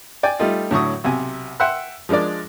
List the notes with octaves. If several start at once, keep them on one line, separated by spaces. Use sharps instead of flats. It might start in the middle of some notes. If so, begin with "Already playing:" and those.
D5 G5 G#5
G3 A3 D#4 F4
A2 D3 F#3 C#6 D#6
B1 C3 G#5
E5 F#5 G5 C6 E6 F#6
F3 G#3 D4 A#4 D5